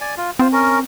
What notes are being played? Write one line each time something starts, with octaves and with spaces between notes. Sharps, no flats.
D5 G#5
F4
C4 F4 C5
C#4 A#4